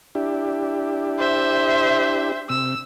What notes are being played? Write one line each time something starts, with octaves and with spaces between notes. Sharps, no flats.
D4 E4 G4
C5 E5
C3 E6